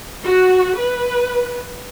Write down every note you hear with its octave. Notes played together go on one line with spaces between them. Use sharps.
F#4
B4